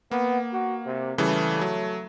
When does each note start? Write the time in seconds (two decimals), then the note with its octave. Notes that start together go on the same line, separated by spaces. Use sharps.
0.11 A#3 B3
0.53 F#4
0.86 C3
1.18 C#3 E3 G3 A3
1.61 F#3